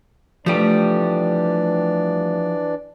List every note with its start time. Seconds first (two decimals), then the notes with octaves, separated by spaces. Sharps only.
0.46 E3 F3 G3 A3 D4 G4 D5